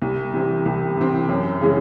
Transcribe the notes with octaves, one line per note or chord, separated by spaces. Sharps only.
C2
C3 E3 C4
C2
C3 E3 C4
F#2
C#3 E3 G#3